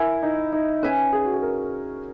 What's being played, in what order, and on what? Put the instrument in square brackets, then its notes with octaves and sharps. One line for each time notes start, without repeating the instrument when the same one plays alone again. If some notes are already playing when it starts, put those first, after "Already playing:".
Already playing: [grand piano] E4 [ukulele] A#4 G#5
[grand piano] D#4
D#4
[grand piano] C#4 [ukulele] B4 E5 G#5
[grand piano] G#4
F#4
G#4
A#4